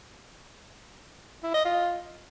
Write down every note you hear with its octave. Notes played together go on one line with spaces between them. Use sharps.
E4
D#5
F4